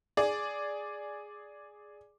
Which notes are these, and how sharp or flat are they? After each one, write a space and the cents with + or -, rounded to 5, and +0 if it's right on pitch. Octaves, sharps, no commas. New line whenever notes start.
G#4 +0 D5 +0